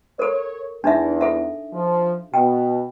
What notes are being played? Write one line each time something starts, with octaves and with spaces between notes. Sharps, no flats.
A4 A#4 C#5
E2 D4 D#4 E5
A4 E5
F3
B2 G5